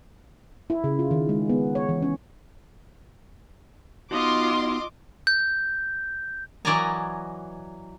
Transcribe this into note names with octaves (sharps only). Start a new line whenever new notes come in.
E4
C#3
F4
D#3
G#3
B3
C#5
E3
C#4
B3 D#4 F4 F#4 D#5 C6 D6
G6
E3 F#3 D5 D#5 G#5 A#5